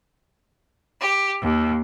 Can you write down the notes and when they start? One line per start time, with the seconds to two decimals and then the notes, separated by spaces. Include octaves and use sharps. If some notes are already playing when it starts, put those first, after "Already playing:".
1.00 G4
1.41 D#2